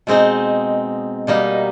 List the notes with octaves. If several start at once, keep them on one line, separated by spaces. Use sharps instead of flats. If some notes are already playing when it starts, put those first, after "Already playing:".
B2 G#3 C4 D#4
B2 G3 A#3 D#4